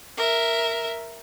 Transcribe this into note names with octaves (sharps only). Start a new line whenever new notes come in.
A#4 E5